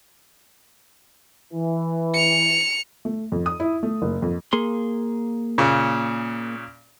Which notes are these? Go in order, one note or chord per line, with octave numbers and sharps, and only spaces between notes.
E3
C#7 F7
A3
F2
D#6
E4
A3
F#1
F2
A#3 G#4 C6
A#2 C#3